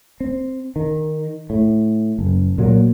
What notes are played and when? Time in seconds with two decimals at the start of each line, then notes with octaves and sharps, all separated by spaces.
0.20 C4
0.76 D#3
1.50 A2
2.19 F#1
2.58 A#2 F#3 G#3 A#3